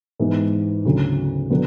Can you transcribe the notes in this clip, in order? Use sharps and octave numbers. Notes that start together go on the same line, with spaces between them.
G#2 E3 G#3 B3 E4
D2 C#3 F#3
D3 F#3 B3